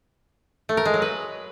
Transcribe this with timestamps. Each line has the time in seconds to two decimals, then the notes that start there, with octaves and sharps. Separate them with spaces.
0.69 A3
0.77 A#4
0.85 G#3
0.94 F#3
1.02 B4